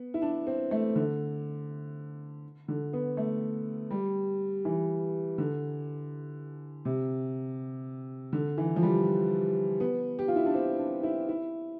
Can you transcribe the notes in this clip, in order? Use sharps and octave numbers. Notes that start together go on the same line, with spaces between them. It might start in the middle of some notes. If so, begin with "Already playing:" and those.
Already playing: B3
E4
D4
C4
A3
D3
D3
B3
A3
G3
E3
D3
C3
D3
E3
F3
G3
B3
G4
F4
E4
D4
C4
D4
E4
E4